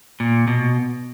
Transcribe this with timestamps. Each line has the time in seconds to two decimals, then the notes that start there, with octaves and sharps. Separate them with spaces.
0.20 A#2
0.48 B2